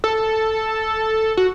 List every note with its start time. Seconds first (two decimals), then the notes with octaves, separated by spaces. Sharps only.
0.04 A4
1.37 F#4